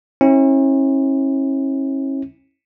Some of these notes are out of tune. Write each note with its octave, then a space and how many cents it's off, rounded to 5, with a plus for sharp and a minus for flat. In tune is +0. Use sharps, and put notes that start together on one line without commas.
C#4 -40 E4 -30